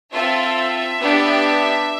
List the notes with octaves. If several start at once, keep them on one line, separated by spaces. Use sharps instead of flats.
C4 F4 A4 E5
B3 D4 G4